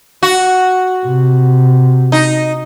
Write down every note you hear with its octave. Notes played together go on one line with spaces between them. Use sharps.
F#4
C3
D#4